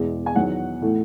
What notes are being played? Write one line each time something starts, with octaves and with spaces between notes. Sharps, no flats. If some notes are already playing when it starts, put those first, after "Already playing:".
Already playing: E2 B2 G#3
G#5
E2 D#3 F#3 F#5
A2 E3 A3